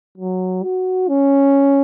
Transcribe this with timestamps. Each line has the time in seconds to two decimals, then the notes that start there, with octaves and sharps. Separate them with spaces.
0.18 F#3
0.63 F#4
1.08 C#4